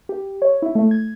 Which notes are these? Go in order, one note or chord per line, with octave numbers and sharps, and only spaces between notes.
G4
C#5
E4
A3
G#6